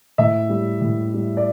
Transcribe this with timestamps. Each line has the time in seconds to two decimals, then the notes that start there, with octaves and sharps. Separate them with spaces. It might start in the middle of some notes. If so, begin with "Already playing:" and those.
0.18 A2 E5
0.49 G3
0.81 A2
1.14 G3
1.37 D5